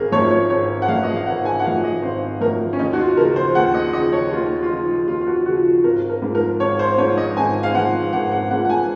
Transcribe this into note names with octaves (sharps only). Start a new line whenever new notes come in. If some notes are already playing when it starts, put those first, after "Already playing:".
Already playing: G#1 G#4 A#4
F#2 F3 C#5
C#5
G#1 C#5
F#5
F#2 F3 F5
D#5
F5
G#1 F#5
G#5
F#5
F#2 F3 F5
D#5
G#1 C5
F#2 F3 A#4
C#4
D#2 D#4
F#4
F4
C#3 F3 A#4
C5
D#2 F#5
D#5
C#3 F3 D#5
C#5
D#2 F4
F4
C#3 F3 D#4
D#2 F4
F4
F#4
C#3 F3 F#4
G#1 A#4
A#4
G#2 F3
A#4
G#1 C#5
C5
G#2 F3 C#5
D#5
G#1 G#5
F5
G#2 F3 F#5
G#1 F#5
F#5
G#2 F3 F#5
F#5
G#5